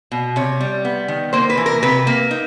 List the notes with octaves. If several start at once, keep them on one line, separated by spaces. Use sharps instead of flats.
B2
C3 C#5
G3
B3
D#3
A#3 C5
B4
E3
A#4
C3 B4
A#3
D#4